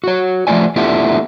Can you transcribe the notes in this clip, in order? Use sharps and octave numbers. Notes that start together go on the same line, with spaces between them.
F#4 C#5
F3 A3 D4 F4 D5 G#5
A3 B3 D4 E4 F4 G4